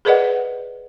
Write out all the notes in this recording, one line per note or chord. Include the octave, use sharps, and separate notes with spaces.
G#4 A#4 B4 D5 D#5 F#5